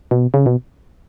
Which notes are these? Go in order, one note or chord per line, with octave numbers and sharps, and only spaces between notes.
B2
C#3
B2